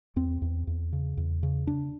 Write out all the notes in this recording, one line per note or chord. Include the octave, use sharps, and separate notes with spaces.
E2 C4
E2
E2
C#3
E2
C#3
C#3 D4